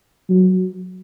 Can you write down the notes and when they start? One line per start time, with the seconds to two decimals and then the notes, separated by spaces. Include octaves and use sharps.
0.29 F#3